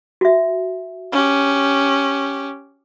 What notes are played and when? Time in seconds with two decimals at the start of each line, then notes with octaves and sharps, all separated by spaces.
0.21 F#4 E5
1.12 C#4 G4